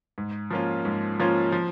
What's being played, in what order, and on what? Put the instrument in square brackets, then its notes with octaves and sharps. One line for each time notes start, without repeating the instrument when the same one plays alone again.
[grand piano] G#2
F3 A#3 C#4 F4
G#2
F3 A#3 C#4 F4
F3